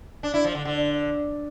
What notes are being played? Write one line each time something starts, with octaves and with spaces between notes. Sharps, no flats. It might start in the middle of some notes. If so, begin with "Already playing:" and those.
D4
E4
F3
D3
D3